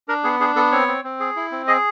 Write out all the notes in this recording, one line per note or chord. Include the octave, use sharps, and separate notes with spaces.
D4 A#4
B3 G#4
D4 G#4
B3 A4
C4 C#5
C4
C4
G#4
E4
C4
G#4 D#5